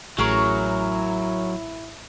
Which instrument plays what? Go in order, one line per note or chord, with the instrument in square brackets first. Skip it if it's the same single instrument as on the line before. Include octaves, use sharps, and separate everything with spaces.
[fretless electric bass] A1 [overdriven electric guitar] F#3 [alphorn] E4 [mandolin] G#4 A#4 C#5